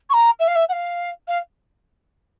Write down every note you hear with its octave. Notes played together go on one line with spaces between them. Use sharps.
C#6
A#5
E5
F5
E5
F#5
F5
F5